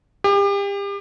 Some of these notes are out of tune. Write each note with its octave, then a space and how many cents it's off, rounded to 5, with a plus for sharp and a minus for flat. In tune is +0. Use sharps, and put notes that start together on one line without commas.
G4 +35